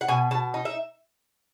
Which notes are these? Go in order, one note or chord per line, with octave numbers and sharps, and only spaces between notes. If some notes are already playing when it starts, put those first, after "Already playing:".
F#5
B2 G#5
B2 A5
D#4
E5